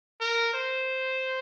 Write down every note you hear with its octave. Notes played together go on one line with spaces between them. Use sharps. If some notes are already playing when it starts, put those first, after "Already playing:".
A#4
C5